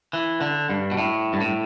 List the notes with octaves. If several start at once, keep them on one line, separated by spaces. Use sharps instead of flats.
E3
D3
G2
B2
A2
G2
A2